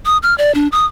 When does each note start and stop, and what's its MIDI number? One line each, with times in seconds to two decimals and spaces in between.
0.06 0.17 87
0.23 0.36 89
0.38 0.52 74
0.55 0.68 62
0.72 0.86 87